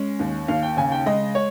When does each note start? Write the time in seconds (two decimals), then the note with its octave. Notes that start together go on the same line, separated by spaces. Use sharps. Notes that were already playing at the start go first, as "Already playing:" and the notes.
Already playing: G#3 C#4
0.19 D#2
0.48 D#2 F5
0.63 G5
0.77 C#3 G#5
0.92 G5
1.06 G#3 D#5
1.35 C#5